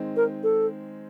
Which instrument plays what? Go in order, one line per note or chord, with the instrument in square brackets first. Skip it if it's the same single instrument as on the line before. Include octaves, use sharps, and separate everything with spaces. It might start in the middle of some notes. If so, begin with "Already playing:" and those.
Already playing: [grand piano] D#3 G#3 C4
[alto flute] A#4
A4